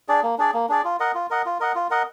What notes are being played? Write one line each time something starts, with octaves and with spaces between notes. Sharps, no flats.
D4 G#4 D5
A#3
D4 G#4 D5
A#3
D4 G#4 D5
F4
A#4 D#5 F#5
F4
A#4 D#5 F#5
F4
A#4 D#5 F#5
F4
A#4 D#5 F#5